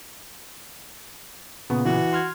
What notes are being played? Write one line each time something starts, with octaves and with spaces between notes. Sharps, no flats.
A#2 C#3 B3
E3 F#4
C6 F6 G#6